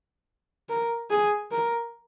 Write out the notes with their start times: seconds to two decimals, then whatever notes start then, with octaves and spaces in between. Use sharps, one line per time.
0.69 A#4
1.10 G#4
1.52 A#4